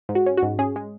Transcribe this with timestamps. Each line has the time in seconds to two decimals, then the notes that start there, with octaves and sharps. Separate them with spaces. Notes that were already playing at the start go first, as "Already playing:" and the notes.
0.09 G#2
0.15 F#4
0.26 C#4
0.37 F#4
0.42 G#2
0.59 C#4 G#4
0.76 G#3